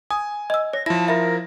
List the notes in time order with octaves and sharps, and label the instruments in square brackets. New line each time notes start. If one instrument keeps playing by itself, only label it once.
[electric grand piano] G#5 [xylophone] D#6
[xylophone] D#5 E6
[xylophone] C#5 [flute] A#6
[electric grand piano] F3 E4 [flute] A5 [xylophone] A#6
[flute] A#4 [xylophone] E5 B5